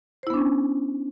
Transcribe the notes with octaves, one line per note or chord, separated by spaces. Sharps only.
B3 C#4 D4 E4 C5